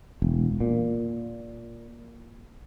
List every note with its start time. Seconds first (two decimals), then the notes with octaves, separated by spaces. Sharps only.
0.22 E1
0.60 A#2